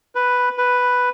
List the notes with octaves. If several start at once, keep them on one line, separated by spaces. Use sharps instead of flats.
B4
B4